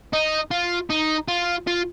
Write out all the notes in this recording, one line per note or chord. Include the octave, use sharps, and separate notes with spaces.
D#4
F4
D#4
F4
F4